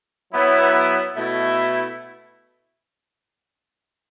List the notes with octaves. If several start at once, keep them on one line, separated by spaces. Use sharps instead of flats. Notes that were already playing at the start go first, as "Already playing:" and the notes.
F#3 B3 E4
B2 A3 E4